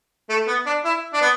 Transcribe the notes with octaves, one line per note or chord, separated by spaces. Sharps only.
A3
B3
D4
E4
D4
B3